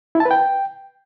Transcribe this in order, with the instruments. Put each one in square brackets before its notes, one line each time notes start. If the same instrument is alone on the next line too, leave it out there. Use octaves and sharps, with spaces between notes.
[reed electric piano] E4
A5
B4
G5